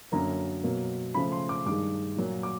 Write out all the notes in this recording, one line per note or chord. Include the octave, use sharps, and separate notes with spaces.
F#2 D3 F#3 A#3 A#5
B2 F#3 A#3
C#3 F3 A3 B5
C6
D6
G2 D#3 G#3 D6
A#2 F#3 A#3
D6